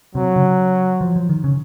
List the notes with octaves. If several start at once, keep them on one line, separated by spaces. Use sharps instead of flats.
C3 F#3
C#3
F3
F3
D#3
C#3